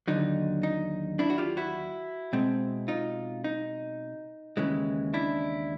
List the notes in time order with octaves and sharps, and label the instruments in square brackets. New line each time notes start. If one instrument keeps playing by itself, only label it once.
[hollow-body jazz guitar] D#2 D3 F#3 D#4
D#4
D4 E4
F#4
F4 G4
E4 F#4
B2 G#3 C4
D#4 F4
D#4
D#2 C#3 E3 G#3
D4 E4